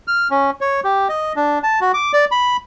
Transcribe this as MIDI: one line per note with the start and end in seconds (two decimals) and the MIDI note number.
0.08 0.28 89
0.31 0.51 61
0.61 0.80 73
0.84 1.08 67
1.09 1.33 75
1.36 1.59 62
1.63 1.80 81
1.81 1.92 66
1.94 2.12 86
2.13 2.25 74
2.31 2.57 83